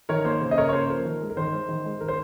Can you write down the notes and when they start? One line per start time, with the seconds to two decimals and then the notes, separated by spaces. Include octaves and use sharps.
0.09 D#3 A#4 C#5
0.25 A#3 C5
0.41 C#3
0.51 D#5
0.57 C#3 A#4 C#5
0.69 C#5
0.73 A#3 C5
0.90 F3 A#4
1.05 D#3
1.22 G#3
1.30 A#4
1.37 D#3 C5
1.54 G#3
1.69 D#3
1.86 G#3
2.01 D#3 A#4
2.08 C5